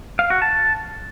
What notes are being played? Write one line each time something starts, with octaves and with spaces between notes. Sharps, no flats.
F5
F#4
A5